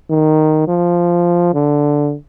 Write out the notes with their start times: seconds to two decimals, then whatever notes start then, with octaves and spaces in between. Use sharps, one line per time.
0.10 D#3
0.68 F3
1.54 D3